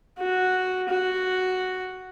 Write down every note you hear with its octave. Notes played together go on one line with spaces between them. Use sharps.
F#4
F#4